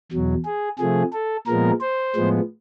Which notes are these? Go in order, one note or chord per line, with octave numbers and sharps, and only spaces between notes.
E2 B2 F#3
G#4
C3 F3 A3 G#4
A4
A#2 F3 G#3 B3 A#4
C5
A2 F3 G#3 B3